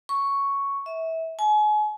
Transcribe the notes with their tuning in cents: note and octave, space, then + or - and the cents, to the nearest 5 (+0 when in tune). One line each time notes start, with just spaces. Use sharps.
C#6 +0
E5 -25
G#5 +35